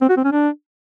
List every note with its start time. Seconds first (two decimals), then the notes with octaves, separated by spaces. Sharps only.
0.02 C4
0.09 F#4
0.17 C4
0.25 C#4
0.32 D4